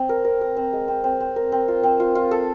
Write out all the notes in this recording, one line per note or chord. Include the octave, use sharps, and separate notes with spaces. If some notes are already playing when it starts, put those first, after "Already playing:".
Already playing: C4
A#4
A#4
A#4
C4
G#3
C4
C4
C4
A#4
C4
F4
C4
F4
F4
A4